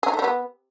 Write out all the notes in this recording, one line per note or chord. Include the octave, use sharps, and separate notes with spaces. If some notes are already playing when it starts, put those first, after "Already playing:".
G#4
D#4
A3
G3
B3